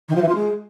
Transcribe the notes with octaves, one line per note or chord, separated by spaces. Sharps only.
D#3
F3
E3
F4
G#3